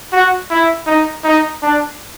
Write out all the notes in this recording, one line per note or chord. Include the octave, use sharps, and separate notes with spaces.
F#4
E4
D#4
D#4
D4